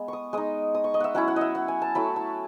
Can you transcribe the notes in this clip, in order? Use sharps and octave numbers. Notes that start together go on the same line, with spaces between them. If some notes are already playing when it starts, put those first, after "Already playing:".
Already playing: G#3 B3
C#6 D#6
G#3 D#4 D#6
D#6
C#6
D#5
E5 F#5
F#3 C#4 E4 F#5
F#5
D#5 E5
F#5
G#5
A5
F#3 A3 E4 B5
A5